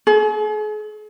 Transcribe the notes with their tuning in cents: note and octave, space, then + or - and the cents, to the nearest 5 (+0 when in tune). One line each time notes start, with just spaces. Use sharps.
G#4 +40